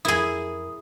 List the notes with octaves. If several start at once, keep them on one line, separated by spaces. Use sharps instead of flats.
F2 E4 G#4 A#4 D#6